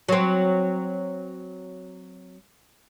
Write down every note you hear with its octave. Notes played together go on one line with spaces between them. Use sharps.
F#3 C4